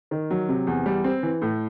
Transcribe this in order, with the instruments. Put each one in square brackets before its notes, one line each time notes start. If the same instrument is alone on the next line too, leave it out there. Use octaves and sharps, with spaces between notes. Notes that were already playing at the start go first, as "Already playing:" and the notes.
[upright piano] D#3
F#3
C3
E2
G3
C4
E3
A2